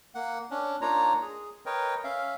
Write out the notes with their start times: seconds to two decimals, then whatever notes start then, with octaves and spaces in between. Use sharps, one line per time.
0.15 A#3 F#5
0.51 C#4 D4
0.81 A#3 D4 D#4 F4 C#5 A#5
1.22 G#4
1.66 A#4 B4 C#5 D#5 G5
2.04 C#4 E5 F5